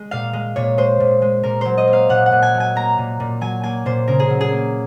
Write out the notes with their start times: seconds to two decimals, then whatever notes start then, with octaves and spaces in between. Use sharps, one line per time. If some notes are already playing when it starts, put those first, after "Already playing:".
Already playing: G#3
0.11 A#2 F5
0.33 G#3
0.56 A#2 C#5
0.78 G#3 C5
1.00 A#2
1.22 G#3
1.44 A#2 A#4
1.61 F#3 C5
1.78 D#5
1.88 A#3
1.93 F5
2.09 A#2 F#5
2.26 F#5
2.32 A#2
2.42 G#5
2.55 F#3
2.60 G#5
2.76 A#3 A#5
2.98 A#2
3.20 A#2
3.41 F#3 G#5
3.63 A#3 G#5
3.86 A#2 C5
4.08 C#3 A#4
4.20 G#4
4.30 F#3
4.41 G#4
4.52 A#3